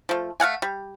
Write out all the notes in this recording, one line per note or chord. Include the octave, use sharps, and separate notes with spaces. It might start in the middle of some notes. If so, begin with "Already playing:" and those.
F3 A3
A3 F5 F#5 G#5
G3